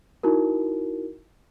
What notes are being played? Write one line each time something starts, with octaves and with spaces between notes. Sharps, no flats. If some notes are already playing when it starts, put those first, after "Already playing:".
D#4 E4 F#4 A#4